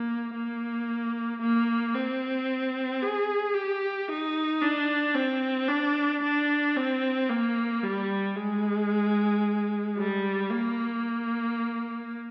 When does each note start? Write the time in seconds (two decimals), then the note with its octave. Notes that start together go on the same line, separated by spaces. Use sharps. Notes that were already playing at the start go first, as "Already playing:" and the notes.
Already playing: A#3
0.34 A#3
1.42 A#3
1.94 C4
3.02 G#4
3.54 G4
4.08 D#4
4.62 D4
5.15 C4
5.68 D4
6.22 D4
6.76 C4
7.29 A#3
7.83 G3
8.36 G#3
9.97 G3
10.51 A#3